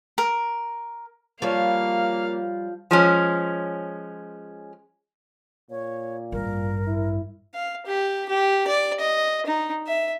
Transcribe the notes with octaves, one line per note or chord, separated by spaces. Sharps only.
A#4
F3 G3 A#3 C#5 F5
F3 G#3 C#4
A#2 C#5
A1 G2 A#4
E4
F5
G4
G4
D5
D#5
D#4
E5